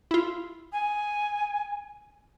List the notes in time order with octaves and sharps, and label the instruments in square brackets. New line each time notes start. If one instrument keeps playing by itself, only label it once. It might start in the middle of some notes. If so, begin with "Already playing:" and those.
[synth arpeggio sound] E4 F4
[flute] G#5